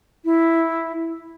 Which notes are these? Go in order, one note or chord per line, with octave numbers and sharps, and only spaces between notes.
E4